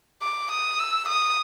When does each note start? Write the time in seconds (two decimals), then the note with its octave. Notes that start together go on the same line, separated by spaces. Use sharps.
0.22 D6
0.51 D#6
0.79 E6
1.09 D#6